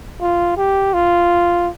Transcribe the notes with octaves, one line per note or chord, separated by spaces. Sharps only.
F4
G4
F4